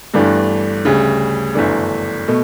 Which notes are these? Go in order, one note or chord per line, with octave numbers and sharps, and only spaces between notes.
G1 G2 E3 A3 D4
D2 C#3 G3
G1 F#2 E3 A3 D4
B2 A3